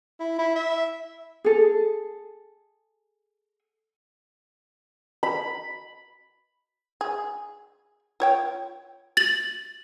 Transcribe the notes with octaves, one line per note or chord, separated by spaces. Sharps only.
E4
E4
E5
G#4 A4
B5
G#4
F4 C#5 G5
A6 F#7